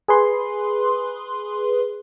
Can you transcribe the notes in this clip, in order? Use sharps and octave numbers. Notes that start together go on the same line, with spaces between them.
G#4 B4 C6